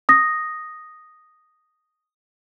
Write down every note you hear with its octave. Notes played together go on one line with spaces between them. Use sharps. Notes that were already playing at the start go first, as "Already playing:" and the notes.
D#6 A#6